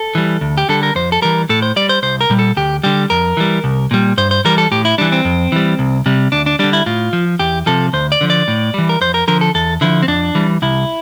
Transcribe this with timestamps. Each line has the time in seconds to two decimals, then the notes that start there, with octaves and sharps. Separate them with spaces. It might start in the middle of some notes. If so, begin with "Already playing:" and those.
Already playing: A4
0.15 E3 G3
0.41 D2
0.58 G4
0.69 D3 G3 A4
0.83 A#4
0.95 F2 C5
1.12 A4
1.22 E3 G3 A#4
1.49 A2 A4
1.62 C5
1.76 G3 D5
1.89 C5
2.03 C2 C5
2.21 A#4
2.30 A#2 G3
2.39 A4
2.57 D2 G4
2.84 D3 G3 G4
3.10 F2 A#4
3.37 E3 G3
3.64 C2
3.91 A#2 G3
4.17 G2 C5
4.31 C5
4.45 E3 G3 A#4
4.58 A4
4.72 A2 G4
4.85 E4
4.98 E3 G3 D4
5.12 C4
5.25 F2
5.52 E3 G3
5.79 C2
6.06 C3 G3
6.32 D2 D4
6.46 D4
6.59 D3 G3 D4
6.73 E4
6.86 A2 F4
7.13 F3
7.39 E2 G4
7.66 C3 F3 A4
7.93 D2 C5
8.12 D5
8.21 D3 F3
8.30 D5
8.48 A2
8.74 E3 G3
8.89 A#4
9.01 F2 C5
9.14 A#4
9.28 D3 F3 A#4
9.41 A4
9.55 E2 A4
9.81 D3 F3 E4
10.02 C4
10.08 F2 D4
10.35 E3 G3
10.62 C2 E4